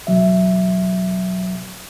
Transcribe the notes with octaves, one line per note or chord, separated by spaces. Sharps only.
E2 B2 F#3 E5